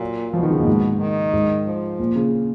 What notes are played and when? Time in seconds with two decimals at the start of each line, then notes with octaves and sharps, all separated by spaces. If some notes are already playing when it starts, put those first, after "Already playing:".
Already playing: A#2 F#3
0.33 B2 F3
0.43 D#3
0.50 C#3
0.59 A#2
0.67 G#2
1.00 D#3
1.33 G#2
1.66 F3
1.99 A#2
2.16 C#3